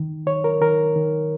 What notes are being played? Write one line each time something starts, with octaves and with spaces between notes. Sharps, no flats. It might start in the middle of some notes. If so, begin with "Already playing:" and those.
Already playing: D#3
D#3 C#5
A#4
D#3 A#4
D#3